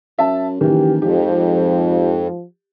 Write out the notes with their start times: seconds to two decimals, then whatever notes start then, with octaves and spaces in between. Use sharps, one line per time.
0.19 F#2 E5 A5
0.61 F#1 D#3 E3 G4
1.02 F2 G#2 F3 G4